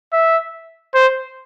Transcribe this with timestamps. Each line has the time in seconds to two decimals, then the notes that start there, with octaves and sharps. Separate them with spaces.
0.13 E5
0.94 C5